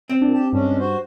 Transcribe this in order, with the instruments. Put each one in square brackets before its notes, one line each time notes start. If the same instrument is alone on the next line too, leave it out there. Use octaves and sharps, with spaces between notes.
[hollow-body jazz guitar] C4
[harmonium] A#2 [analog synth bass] D4
[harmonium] G4 A5
[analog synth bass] G2 [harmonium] G#3 C#4 D4
[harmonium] F#4 C5